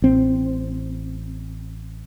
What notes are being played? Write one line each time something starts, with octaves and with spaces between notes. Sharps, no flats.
A1 C4